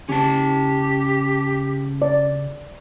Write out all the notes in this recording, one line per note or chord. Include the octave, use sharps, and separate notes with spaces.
C#3 C#4 G4 A5
D5